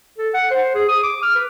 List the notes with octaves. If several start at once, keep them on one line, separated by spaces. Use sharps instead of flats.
A4
F#5
C5
G#4
D#6
D6
F6
B4